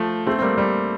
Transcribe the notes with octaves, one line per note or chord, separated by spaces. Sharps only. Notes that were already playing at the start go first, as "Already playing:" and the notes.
Already playing: F3 A3
A3 C4
C4
G3 A#3
G3